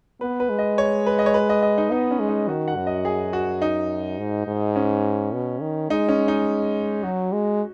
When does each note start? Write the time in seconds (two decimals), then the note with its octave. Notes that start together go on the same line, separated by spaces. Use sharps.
0.21 B3 B4
0.40 B4
0.50 G#3
0.59 D#5
0.78 C#5
1.06 B4
1.19 D#5
1.26 C#5
1.34 B4
1.49 D#5
1.62 D#5
1.78 D#4
1.91 B3 D#4
2.11 C#4
2.19 G#3
2.29 D#4
2.48 D#3 F#4
2.68 F#5
2.76 F#2
2.87 D#5
3.05 G#4
3.33 F#4
3.62 D#4
4.18 G#2
4.47 G#2
4.76 C#4
5.33 B2
5.61 D#3
5.90 G#3 D#4
6.09 C#4
6.28 D#4
7.03 F#3 F#4
7.32 G#3